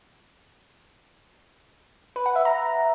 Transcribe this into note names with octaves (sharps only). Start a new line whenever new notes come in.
B4
F#5
E5
A#5